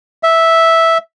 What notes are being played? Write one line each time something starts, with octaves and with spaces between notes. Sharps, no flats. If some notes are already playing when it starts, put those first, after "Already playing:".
E5